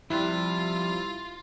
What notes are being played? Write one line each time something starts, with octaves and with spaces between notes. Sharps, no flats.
C3 F3 G3 E4 F4 F#6